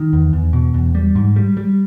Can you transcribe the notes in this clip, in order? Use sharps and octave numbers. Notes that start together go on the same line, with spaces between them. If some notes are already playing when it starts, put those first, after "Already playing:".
Already playing: D#3
E2
E2
B2
E2
G3
G#2
G3
G3